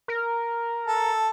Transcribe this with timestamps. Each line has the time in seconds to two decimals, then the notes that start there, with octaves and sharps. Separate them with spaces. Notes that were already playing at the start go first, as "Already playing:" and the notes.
0.08 A#4
0.87 A4